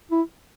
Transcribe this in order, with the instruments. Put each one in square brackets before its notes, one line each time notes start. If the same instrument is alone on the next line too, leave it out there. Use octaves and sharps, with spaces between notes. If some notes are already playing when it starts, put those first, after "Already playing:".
[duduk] E4